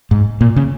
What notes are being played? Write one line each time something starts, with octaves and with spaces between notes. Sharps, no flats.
G#2
A#2
C#3